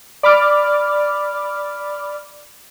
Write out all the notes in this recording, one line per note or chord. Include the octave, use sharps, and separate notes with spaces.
D5 B5 D6 F6